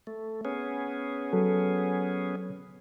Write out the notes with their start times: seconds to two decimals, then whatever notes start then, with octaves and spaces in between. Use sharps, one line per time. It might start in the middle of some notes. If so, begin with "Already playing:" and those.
0.07 A3
0.45 B3 C#4 G#4
1.33 F#3 A4